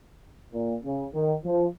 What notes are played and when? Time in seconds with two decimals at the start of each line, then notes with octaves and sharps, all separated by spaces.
0.53 A#2
0.84 C#3
1.14 D#3
1.45 F3